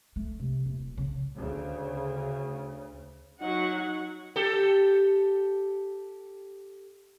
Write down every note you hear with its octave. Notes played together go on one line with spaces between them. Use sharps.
A3
C3
D#1
C#3
D2 C#3
F#3 D#4 F#5 C#6
G4 A4